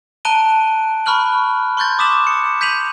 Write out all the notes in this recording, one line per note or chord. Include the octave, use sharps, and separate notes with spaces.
A5 A#5 F#6 D7 D#7 G7
A#5 B5 C#6 F6 F#6 F#7
C6 C#6 F#6 G6 A6
D6 D#6 B6 E7 F#7
C#7
G6 B6 D#7 F7 F#7